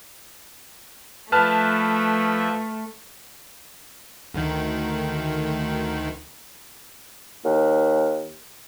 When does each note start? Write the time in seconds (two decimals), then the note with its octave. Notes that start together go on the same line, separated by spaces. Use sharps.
1.32 F3 A3 B4 E5 A5 F6
4.34 D2 D#3
7.45 D#2